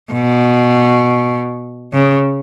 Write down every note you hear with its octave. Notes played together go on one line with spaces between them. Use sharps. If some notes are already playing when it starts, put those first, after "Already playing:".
B2
C#3